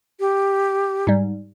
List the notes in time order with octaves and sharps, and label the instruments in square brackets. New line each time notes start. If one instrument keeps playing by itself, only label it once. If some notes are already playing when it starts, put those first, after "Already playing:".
[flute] G4
[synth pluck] G#2 G3